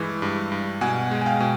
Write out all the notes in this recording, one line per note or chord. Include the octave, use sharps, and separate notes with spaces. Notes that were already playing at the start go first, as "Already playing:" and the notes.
Already playing: G2 E3 G#3
G2
G2
B2 F#5 G#5
G#3
G#5
F5 G5
B2